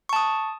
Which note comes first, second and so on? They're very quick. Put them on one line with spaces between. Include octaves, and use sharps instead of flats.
C#6 A5 D#6